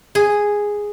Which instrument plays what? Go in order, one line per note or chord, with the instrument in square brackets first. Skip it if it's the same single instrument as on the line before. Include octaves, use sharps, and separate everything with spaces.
[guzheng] G#4